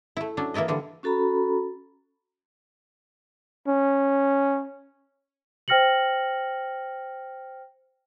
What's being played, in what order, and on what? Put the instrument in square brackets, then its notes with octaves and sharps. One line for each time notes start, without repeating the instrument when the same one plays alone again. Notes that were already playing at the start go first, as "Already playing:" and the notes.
[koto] A3 E4
F#3 C#4 D4
E3 A#3 E4 D5 D#5
D3 E3 G3
[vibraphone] C#4 F#4 A4 A#5 B5
[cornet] C#4
[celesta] C5 G5 F6 A#6 C#7 F#7